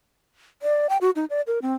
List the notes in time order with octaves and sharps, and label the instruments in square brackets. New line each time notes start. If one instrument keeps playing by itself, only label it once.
[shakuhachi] D5
G5
F#4
D#4
D5
A#4
C4